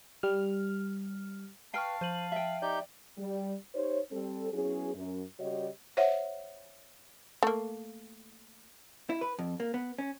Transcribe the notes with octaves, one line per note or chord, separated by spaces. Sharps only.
G3 F6
B4 F5 G5 A5 C#6 F6 C7
F3 C5 D#7 F#7
E5 G5
D#4 G4 D5 G6
G3
D#4 G4 C5 C#5
G3 C4 A4
F#3 B3 C#4 E4 G#4
F#2
C#3 G3 F#4 G4 C#5 D#5
C5 C#5 E5 F#5
A3 A#3
E4
B4
F2
A#3
B3
C#4